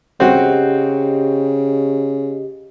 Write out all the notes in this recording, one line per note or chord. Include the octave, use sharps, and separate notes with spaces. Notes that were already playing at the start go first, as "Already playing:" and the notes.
C#3 C4 F#4 G4 D#5